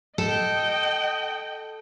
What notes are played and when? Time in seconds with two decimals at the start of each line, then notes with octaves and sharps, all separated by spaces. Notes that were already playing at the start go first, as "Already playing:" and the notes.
0.18 A4 D#5 G5